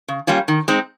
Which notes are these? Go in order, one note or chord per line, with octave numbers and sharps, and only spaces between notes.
C#3
G3 A#3 C#4 F4
D#3
G#3 C4 D#4